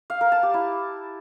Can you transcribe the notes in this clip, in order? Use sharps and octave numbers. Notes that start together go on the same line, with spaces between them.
F5
A#4
A5
G4
E4